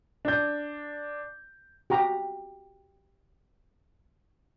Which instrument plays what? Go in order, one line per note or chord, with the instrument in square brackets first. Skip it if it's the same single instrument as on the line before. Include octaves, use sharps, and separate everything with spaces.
[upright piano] D4 G6
[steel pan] F#4 G4 A#5